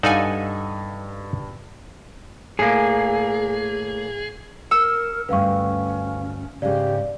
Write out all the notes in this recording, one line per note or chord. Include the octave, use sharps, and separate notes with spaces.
G2 D#4 A4 D5 F5 F#5 G#5
A2 A#3 G#4
A#4 E6 C#7
D2 G2 C#4 B4 F5 C#6
G#2 C#3 G4 D5